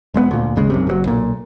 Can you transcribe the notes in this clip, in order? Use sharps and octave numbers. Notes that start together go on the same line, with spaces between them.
E1 G#3 A3 B3
D2 A#2
G#1 D#2 C#3 G#3
B1 F#2 C3
F#1 A2 F#3
B1 A#2